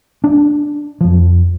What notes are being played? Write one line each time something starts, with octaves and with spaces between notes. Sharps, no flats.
D4
F2 F3